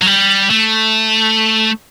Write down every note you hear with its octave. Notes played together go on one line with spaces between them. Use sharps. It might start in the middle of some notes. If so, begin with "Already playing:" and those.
F#3
G3
A3